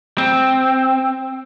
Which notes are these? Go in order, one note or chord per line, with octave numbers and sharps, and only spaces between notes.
C4